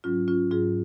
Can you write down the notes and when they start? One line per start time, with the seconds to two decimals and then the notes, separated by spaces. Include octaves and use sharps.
0.04 G#2 F#3 C#4 F4
0.28 C#4 F4
0.51 G#2 F#3 F4 G#4